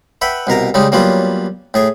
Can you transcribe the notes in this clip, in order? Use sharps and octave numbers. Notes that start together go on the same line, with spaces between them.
B4 E5 F#5 G5
C2 B2 A#4 A#5
C#3 G3 G#3 D#4
F#3 G3 A#3 B3 C#4 F4
A2 G#4 G#5